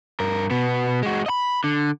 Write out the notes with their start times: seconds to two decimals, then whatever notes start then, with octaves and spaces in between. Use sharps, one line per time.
0.20 G2 A#4
0.51 B2 B3
1.03 G#3 F#4
1.26 D#5 B5
1.64 D3